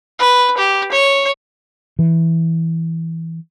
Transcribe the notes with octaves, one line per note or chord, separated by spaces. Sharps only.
B4
G4
C#5
E3